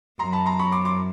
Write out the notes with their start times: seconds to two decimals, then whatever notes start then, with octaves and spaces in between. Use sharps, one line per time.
0.19 F#2 A#5 C6
0.33 A5 B5
0.46 A#5 C6
0.59 B5 C#6
0.72 C6 D6
0.85 C6 D6